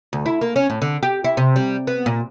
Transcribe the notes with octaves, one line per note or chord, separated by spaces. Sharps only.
D2
E4
A#3
C#4
A2
D3
G4
E4
C3
G3
B3
A#2